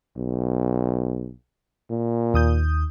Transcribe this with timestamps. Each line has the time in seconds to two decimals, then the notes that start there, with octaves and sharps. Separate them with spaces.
0.17 B1
1.90 A#2
2.34 D#2 D#6 G6